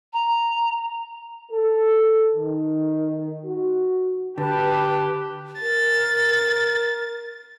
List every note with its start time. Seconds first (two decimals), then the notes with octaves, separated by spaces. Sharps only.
0.13 A#5
1.52 A4
2.36 D#3
3.45 F#4
4.38 D3 G4 B4 A5
5.61 A#4 A6